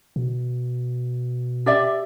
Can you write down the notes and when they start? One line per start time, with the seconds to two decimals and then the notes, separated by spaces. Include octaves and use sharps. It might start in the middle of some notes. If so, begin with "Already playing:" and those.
0.16 B2
1.66 G4 D5 E5